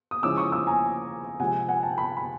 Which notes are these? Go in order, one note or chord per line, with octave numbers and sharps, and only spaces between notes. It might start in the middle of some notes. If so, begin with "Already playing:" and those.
D#6
C#3 F3 G#3 C#4 E4 D6 E6
C#6 D#6
D6 E6
G#5 A#5
C3 F3 G#3 F#5 G#5
F#5 G#5
G5 A5
A5 B5
B5